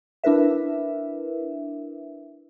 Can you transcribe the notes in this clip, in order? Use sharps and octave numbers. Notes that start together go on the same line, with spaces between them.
D4 E4 A#4 B4 E5